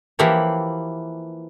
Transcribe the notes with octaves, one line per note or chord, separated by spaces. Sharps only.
E3 F3 A#3 E4 G4 C#5